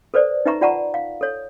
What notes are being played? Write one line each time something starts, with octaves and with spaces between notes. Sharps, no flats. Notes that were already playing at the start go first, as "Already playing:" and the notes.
A4 B4 C5 D5
D#4 B4 E5 A#5 C#6
F4 D5 F#5 A5 A#5 C#6
F5
A4 C#5